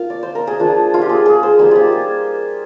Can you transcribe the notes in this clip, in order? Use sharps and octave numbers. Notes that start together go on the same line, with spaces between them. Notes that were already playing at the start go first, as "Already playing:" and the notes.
Already playing: A#3 F4 F5
D5
C5
A#4
G#4
F3 A#3 D4 F4
F4
G4
G#4
G#4
C5
G3 A#3 D#4 G#4
F4 G4
G#4